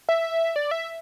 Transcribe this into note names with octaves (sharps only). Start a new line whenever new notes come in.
E5
D5
E5